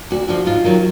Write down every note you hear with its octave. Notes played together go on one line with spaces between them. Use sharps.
D2 F#4
D3 F3 F#4
G#2 F4
D#3 F#3